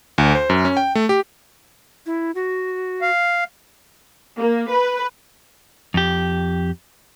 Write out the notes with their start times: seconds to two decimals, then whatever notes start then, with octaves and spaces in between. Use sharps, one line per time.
0.18 D2
0.35 C5
0.50 F#2
0.65 C#4
0.77 G5
0.95 A3
1.09 G4
2.06 E4
2.35 F#4
3.01 F5
4.38 A#3
4.70 B4
5.94 F2 G4